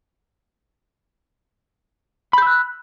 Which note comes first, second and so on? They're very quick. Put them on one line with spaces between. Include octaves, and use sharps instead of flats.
B5 G6 E6 F#6